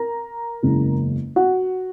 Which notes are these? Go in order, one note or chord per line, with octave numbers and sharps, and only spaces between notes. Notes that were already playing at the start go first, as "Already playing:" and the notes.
Already playing: A#4 A#5
F#1 E2 C#3 E3 G#3
F#4 F#5